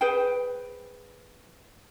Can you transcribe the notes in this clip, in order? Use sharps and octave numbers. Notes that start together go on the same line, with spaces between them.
G#4 B4 C5 G5